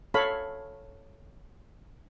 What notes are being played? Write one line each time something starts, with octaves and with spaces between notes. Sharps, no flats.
A4 C#5 F5 B5